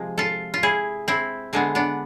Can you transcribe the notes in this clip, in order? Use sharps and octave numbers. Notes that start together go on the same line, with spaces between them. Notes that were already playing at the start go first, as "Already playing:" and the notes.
Already playing: C3 F3 G#3
F4 A4
F4
E4 G#4
C4 E4
D3 G#3 B3 C4
B3 D4